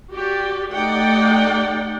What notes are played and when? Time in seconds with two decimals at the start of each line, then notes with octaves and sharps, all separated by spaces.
0.13 F#4 G4 D5
0.73 A3 D#4 G4 D5 F#5 G5